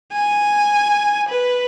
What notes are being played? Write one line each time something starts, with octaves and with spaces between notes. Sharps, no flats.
G#5
B4